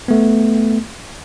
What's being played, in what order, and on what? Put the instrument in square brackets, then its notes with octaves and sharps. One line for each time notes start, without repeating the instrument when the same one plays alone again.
[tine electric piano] A3 B3